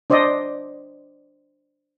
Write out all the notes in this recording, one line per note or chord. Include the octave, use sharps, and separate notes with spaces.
D4 C5 D5 D#5